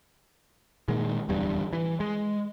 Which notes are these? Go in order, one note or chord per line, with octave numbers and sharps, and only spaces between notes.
A#2 D#3 G#3
D1 E2 G2 G3
E3
G#3